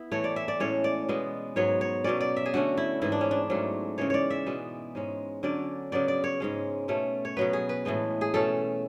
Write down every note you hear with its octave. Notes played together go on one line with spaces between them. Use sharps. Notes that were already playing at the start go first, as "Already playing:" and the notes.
Already playing: B3 E4
A2 E3 A3 C#5
D5
E5
D5
A2 G#3 C#4 C#5
D5
B2 G#3 B3
G#2 F#3 B3 C#5
C#5
B2 F#3 C#4 D5
D5
E5
G#4
D3 A3 C#4 F#4
E4
G#2 E3 B3 E4
D4
C#4
D4
G#2 F#3 A3 C#4
C#3 E3 G#3 C#5
C#5 D5
E5
B2 G#3 B3
G#2 G#3 C#4
D3 F#3 C#4 D5
C#3 F#3 B3 D5
D5
C#5
G#2 G#3 C#4
B2 A3 C#4
C#5
B2 F#3 B3 B4
G#4
B4
A2 E3 G#3 B3
G#4
B2 A3 C#4 A4